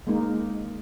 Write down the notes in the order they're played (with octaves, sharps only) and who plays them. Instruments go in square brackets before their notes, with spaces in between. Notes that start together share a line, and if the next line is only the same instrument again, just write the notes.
[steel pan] G#3 A#3 D#4